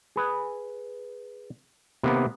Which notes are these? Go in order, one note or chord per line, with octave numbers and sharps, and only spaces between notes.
G#4 B4
C3 D#3 A#3 B3